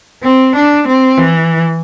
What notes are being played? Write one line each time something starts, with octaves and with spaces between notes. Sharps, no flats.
C4
D4
C4
E3